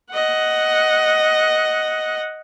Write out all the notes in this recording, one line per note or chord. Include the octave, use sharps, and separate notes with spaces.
D#5 F#5